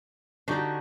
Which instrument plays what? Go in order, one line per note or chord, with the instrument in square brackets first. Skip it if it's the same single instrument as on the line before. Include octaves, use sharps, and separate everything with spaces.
[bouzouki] D3 F#4 [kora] D4 D#4 G4